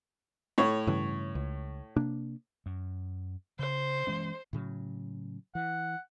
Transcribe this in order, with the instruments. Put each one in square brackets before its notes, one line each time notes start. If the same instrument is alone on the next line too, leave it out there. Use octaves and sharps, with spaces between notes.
[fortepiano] A2 C#5
[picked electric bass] G2 C#3 E3
C#2
C3 A#3 D4
[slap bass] F#2
[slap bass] C#3 [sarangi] C5
[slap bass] E3 G#3 C#4
[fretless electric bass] A2 C#3 F#3
[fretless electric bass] E3 [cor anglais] F#5